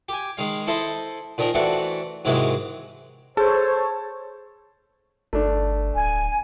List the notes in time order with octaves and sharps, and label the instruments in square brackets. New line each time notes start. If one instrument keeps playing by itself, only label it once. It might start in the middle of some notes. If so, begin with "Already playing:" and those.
[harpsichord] G4 G#5
D#3 G#3 F5
E4 A4 C5 D#5 E5
A#2 D#3 F3 A#4
E3 A3 C4 D4 F#4 F#5
G#2 C3 D#3 E3 F#3 G#3
[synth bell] G#4 [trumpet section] A4 C#5 [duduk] C5 [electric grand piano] A5
[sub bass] G1 [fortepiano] A3 D4
[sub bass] D1 [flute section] G#5